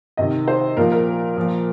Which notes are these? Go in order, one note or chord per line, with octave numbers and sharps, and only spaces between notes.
C3 D#3 D#5
C5
A#2 F3 A#4
A#4
A#2 F3